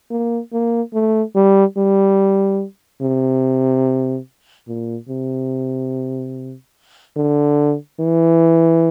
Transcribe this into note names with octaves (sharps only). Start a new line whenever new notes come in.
A#3
A#3
A3
G3
G3
C3
A#2
C3
D3
E3